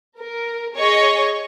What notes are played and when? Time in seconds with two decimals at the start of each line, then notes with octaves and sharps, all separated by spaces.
0.19 A#4
0.77 G#4 C#5 D#5 C#6